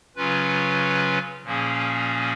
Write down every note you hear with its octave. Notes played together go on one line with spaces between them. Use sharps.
C#3 F#3 C#4 F4 B4
A#2 F3 A#3 C#4 G#4